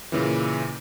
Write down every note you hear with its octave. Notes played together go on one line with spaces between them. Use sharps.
A#2 C#3 E3